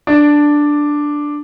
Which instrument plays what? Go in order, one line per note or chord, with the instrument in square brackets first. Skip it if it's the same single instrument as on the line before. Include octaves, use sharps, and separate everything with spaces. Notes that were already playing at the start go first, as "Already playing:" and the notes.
[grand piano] D4